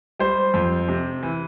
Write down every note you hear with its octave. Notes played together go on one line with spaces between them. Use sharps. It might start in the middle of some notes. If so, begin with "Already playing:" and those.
G3 C5
F2
C3
E3